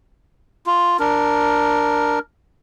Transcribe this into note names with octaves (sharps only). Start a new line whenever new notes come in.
F4
D4 A#4